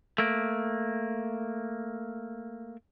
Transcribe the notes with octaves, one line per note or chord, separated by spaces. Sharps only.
A3 A#3